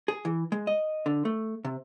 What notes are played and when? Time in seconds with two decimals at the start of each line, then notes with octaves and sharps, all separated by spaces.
0.08 G#4
0.25 E3
0.52 G#3
0.67 D#5
1.06 D3
1.25 A3
1.65 C3